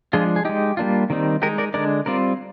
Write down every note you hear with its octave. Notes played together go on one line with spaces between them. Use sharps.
F3 G#3 D4 F4 G#4
G#4
G#3 D#4 G4
G3 A#3 D4 F4
D#3 G3 C4 D#4
G#3 D#4 G4 A#4
A#4 D5
D3 G#3 D4 A#4 D5
G3 C4 F4 A#4 D5